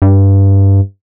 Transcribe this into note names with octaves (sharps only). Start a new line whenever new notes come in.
G2